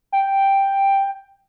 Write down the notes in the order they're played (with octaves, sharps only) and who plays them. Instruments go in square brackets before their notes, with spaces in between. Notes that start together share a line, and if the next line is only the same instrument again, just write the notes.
[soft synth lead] G5